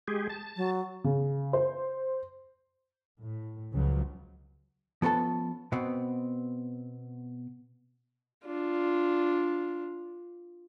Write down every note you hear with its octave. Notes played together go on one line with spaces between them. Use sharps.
G#3 G4 G#4
A5
F#3
C#3
C5
A2
C#2 C#3 F3 F#3
F3 B3 C#4 A4 A5
B2 B3 C4
D4 F4